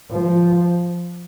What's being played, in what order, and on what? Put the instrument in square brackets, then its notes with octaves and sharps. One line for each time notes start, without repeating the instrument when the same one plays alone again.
[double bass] F3